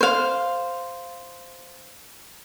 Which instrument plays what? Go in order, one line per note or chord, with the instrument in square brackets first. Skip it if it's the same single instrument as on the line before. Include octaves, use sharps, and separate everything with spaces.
[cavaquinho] C5 F5